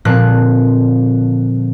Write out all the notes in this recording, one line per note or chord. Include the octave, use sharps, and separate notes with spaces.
A#2 D3 F3 C4 F#6